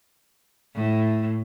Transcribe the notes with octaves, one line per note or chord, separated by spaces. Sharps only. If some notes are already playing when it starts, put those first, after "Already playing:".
A2